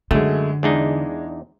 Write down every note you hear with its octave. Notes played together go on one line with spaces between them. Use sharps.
F#2 D3 G#3 A3
E2 G#3 D4 D#4